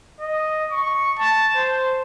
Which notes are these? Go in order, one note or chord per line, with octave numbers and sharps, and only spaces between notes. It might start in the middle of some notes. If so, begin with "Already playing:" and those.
D#5
C#6
A5
C5